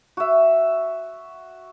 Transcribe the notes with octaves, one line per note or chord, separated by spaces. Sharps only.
F#4 E5